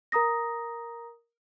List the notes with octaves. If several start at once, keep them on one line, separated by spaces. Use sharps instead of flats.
A#4 A#5 D#6 A#6